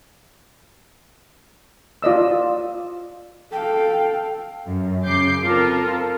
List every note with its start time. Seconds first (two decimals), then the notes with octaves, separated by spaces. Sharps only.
2.02 F4 D5 D#5 E6
3.53 A4 F5 G5
4.66 F#2
5.04 C#3 D6 G6 C7
5.44 C4 F4 A4 A#4